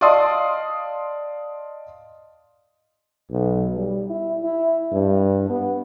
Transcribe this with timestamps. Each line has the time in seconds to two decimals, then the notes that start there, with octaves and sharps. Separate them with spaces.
0.01 D5 D#5 F5 A5 C6 D#6
3.31 B1
3.77 G3
4.10 E4
4.43 E4
4.92 G2
5.49 B3